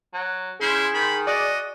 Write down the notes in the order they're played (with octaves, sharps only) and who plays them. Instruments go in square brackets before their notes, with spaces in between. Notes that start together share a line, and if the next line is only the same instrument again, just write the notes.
[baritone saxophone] F#3
[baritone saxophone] C#3 [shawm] E4 [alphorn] G#4 [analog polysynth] C6 G6 G#6
[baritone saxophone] D#3 [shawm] B5
[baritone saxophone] F#4 [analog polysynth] D5 [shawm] D#5